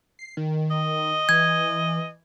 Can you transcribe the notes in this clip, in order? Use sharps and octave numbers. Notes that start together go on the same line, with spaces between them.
C7
D#3
D#5
E3 G#6